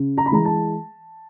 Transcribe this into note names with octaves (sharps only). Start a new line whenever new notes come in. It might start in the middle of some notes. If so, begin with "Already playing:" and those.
Already playing: C#3
A#5
B5
E3 G#3 A#5
A5